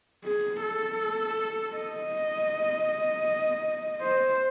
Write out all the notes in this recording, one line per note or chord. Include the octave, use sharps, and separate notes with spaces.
G#4
A4
D#5
C5